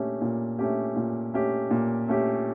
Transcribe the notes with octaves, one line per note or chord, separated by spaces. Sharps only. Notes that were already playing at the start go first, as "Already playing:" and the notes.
Already playing: A#2 A3 C#4 G4
A#2
A3 C#4 G4
A#2
A3 C#4 G4
A#2
A3 C#4 G4